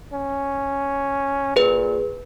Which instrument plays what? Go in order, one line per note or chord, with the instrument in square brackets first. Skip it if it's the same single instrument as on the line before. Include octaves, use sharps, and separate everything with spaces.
[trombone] C#4
[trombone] A#2 [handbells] G#4 B4